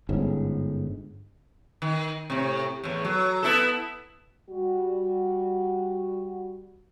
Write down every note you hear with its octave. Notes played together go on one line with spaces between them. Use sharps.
G1 G#2 C#4
D#3
A2 C3
E2 A2
F#3
B3 E4 A4
G3 F#4